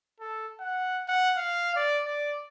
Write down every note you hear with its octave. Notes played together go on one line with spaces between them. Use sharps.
A4
F#5
F#5
F5
D5
D5